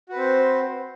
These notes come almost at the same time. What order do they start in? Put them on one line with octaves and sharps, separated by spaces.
F#4 B4 C4 C5